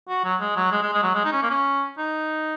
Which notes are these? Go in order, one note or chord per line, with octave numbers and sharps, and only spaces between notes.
F#4
F#3
G#3
F#3
G#3
G#3
G#3
F#3
G#3
D#4
C#4
A#3
C#4
D#4